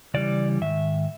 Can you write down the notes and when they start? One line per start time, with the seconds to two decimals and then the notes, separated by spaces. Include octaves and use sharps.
0.14 C#3 E3 G3 D5
0.61 G#2 D#3 E5